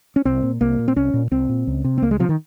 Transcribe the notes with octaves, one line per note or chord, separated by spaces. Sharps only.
C#4
C2 C4
A#2
C2 A#3
A#2
C4
C2 C#4
A#2
C2 C4
A#2
C#2
C3
C4
C#2 A#3
G#3
C3 F3
D#3